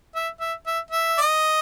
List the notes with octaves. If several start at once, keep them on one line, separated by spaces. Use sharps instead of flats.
E5
E5
E5
E5
D5
D#5